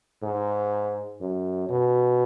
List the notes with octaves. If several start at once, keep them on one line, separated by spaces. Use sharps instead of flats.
G#2
F#2
B2